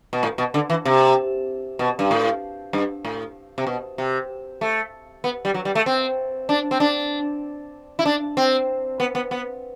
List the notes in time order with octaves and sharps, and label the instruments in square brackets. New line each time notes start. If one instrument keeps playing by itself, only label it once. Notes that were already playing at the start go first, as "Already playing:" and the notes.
[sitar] B2
A2
B2
D3
E3
C3
B2
G2
A2
G2
A2
C3
B2
C3
A3
B3
G3
F#3
G3
A3
C4
D4
C4
D4
E4
D4
C4
B3
B3
B3